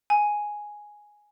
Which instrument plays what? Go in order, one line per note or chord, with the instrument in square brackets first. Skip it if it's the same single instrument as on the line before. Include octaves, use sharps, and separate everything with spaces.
[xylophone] G#5